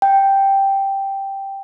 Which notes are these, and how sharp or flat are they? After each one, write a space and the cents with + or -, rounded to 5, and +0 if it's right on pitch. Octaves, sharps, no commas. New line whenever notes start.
G5 +0